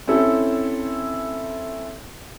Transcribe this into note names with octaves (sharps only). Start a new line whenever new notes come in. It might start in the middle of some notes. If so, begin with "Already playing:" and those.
C4 C#4 E4 A4